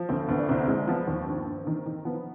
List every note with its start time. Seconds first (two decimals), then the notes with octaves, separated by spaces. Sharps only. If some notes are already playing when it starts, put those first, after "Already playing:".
Already playing: F3
0.09 D2 C4
0.28 D2 B3
0.39 D4
0.49 C2 C4
0.58 B3
0.68 C2 G#3
0.88 F3 B3
1.07 D#2 C4
1.27 G2
1.46 G2
1.67 D#3
1.86 D#3
2.05 F3 B3